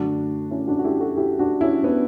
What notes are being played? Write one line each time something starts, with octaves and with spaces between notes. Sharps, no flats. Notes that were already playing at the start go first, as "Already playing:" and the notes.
Already playing: F#2 D3 A3 D4 F#4
C#4 E4
D4 F#4
F#4
E4 G4
F#4 A4
E4 G4
D4 F#4
C#4 E4
B3 D4